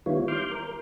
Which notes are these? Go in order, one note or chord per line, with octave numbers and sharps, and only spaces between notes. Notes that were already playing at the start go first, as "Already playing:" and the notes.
D#3 G3 B3 E4 F4 C#5
C6 D6 F6 G6
A#4